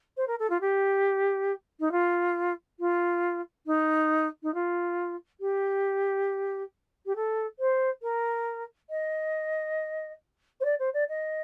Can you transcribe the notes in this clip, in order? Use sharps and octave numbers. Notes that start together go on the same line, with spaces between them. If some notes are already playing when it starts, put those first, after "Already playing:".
C5
A#4
A4
F4
G4
D#4
F4
F4
D#4
D#4
F4
G4
G4
A4
C5
A#4
D#5
C5
D5
C5
D5
D#5